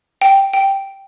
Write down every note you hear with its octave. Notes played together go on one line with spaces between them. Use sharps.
G5
G5